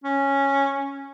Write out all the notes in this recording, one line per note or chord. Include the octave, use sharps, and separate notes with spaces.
C#4